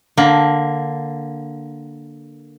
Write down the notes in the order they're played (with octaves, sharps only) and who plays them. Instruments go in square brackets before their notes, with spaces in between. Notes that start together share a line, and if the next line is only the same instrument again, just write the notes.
[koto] D3 A#3